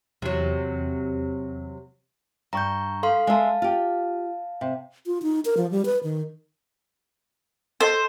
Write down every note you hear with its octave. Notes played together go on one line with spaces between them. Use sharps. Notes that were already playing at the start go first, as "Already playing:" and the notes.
E2 C3 E3 F#3
G2 A#5 C#6 G6
A4 F5 C6
G#3 E5 F5 A5
F4 G4
C3
F4
D#4
A#4
F3
G3
B4
D#3
A4 C5 D#5